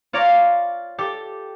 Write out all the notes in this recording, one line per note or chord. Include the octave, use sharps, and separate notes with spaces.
F4 C#5 D5 A#5
G4 A4